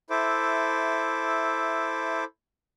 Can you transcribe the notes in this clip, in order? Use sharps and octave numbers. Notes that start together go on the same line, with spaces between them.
E4 A4 C5 E5 D6